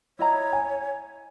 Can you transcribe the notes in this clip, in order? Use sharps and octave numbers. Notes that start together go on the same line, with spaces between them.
E4 C#5 D#5 A#5
G#5